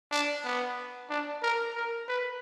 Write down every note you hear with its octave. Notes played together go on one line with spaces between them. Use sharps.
D4
B3
D4
A#4
A#4
B4